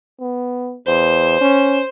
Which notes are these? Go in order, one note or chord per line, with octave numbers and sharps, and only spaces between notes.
B3
E2 C5
C#4